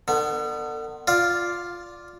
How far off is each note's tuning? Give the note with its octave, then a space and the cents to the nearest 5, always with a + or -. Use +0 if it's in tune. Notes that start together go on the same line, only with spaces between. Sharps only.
D3 +40 B3 +0
F4 +0 D5 +0 F5 +0